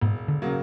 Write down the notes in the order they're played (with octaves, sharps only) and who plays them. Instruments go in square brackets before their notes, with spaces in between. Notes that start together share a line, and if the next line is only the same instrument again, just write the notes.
[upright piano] E1 [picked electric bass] G#2
[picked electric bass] D3
[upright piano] C#3 F#3 A#3